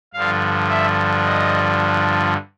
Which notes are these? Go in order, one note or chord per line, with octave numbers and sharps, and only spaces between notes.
G2 D3 F3 F5
E5
D#5